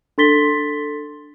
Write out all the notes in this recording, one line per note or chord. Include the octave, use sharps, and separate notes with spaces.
D4 A4 C6 A6 B6 G7